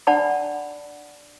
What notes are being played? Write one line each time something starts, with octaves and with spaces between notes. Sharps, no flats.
D4 D5 F#5 A5 B5